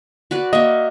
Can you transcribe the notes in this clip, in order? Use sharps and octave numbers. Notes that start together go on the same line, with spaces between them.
F#4 B4 D5
A#3 D#5 E5